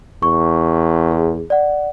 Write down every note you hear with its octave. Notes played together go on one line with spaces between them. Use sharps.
E2 C#6
G#4
D5 F#5